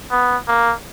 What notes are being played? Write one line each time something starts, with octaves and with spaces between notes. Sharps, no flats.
B3
A#3